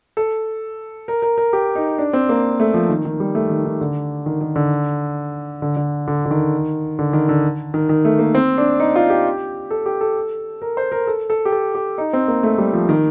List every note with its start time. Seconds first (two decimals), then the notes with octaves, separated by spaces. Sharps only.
0.17 A4
1.08 A#4
1.22 A#4
1.38 A#4
1.53 G4
1.75 D#4
1.99 D4
2.13 C4
2.29 A#3
2.60 A3
2.74 F3
2.89 D#3
3.05 D#3
3.20 G3
3.35 A3
3.49 D#3
3.65 D#3
3.81 D3
4.26 D#3
4.41 D#3
4.56 D3
5.62 D3
5.77 D3
6.08 D3
6.25 D3
6.31 D#3
6.99 D3
7.13 D#3
7.29 D3
7.74 D#3
7.89 D#3
8.05 A3
8.19 A#3
8.35 C4
8.58 D4
8.80 D#4
8.96 F4
9.10 G4
9.71 A4
9.86 G4
10.01 A4
10.62 A#4
10.77 C5
10.92 A#4
11.07 A4
11.30 A4
11.45 G4
11.52 A4
11.75 G4
11.98 D#4
12.13 C4
12.28 A#3
12.43 A3
12.58 G3
12.73 F3
12.89 D#3